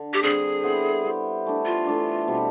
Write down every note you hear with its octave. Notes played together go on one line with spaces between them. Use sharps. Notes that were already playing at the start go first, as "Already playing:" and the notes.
Already playing: D3
G4
D3 G3 C4 G#4
B3 E4 G4 C5
B3 E4 G4 C5
E3 A3 D4
F4
E3 A3 D4
B2 G3 C4